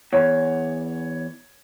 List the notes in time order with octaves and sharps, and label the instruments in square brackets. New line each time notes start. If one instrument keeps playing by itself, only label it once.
[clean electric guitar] E2 [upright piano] C#5